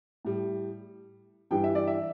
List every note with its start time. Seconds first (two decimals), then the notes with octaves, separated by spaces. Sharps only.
0.25 A2 G3
1.51 G2 E3 G3 G5
1.64 E5
1.75 D5
1.87 E5